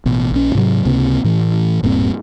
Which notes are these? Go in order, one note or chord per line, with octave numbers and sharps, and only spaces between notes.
A1 B2
A#1 C#4
G#2 C3 F#3
C#2 C3 A#3 C4
A2 E3
D1 G2 A#2 C4